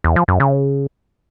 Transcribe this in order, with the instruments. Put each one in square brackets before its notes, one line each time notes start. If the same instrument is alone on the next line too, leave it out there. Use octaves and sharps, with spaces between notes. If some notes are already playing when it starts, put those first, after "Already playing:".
[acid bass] E2
F3
F#2
C#3